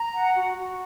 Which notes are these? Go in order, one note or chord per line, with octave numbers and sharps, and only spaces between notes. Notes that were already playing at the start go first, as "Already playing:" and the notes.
Already playing: A#5
F#5
F#4
F#4